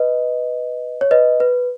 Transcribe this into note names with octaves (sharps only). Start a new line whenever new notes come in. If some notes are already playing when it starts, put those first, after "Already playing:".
Already playing: B4 D#5
C#5
B4 D#5
B4